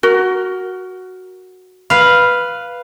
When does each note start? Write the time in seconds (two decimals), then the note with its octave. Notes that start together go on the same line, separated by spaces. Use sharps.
0.03 F#4 A#4
1.90 B4 F5